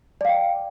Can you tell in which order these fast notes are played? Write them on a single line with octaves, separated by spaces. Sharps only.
D5 F5 G5